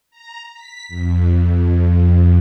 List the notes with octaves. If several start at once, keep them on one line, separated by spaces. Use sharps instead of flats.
A#5
B6
F2